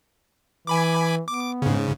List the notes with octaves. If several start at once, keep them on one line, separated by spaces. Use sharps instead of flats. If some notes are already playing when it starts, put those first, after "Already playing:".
E3 G#5 B5 D6
B3 D6
G#2 C#3